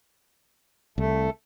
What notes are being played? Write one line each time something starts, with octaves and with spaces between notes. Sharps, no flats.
C2 A3